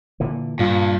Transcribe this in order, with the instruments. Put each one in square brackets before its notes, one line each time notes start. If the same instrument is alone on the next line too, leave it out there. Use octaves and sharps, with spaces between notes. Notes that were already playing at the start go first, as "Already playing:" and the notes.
[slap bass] A#2 D3 E3
[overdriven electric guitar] G2 [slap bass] A#2 [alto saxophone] F4